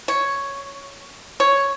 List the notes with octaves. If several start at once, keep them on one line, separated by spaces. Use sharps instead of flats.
C#5
C#5